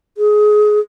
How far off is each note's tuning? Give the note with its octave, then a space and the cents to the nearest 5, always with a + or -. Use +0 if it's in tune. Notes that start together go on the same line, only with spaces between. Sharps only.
G#4 +20